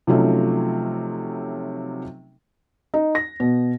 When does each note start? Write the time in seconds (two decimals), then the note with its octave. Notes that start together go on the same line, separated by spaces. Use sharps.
0.07 C3 F3 F#3 A3 C#4 D#4
2.94 D#4
3.15 A#6
3.40 B2